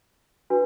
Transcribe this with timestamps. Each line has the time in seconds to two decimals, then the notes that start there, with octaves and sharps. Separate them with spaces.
0.50 D4 F#4 B4